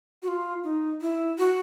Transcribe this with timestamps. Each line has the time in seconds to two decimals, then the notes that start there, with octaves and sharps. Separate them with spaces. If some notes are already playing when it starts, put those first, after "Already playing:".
0.22 F#4
0.28 F4
0.64 D#4
1.02 E4
1.38 F#4